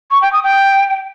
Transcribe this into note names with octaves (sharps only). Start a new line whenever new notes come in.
C#6
G5
D#6
G5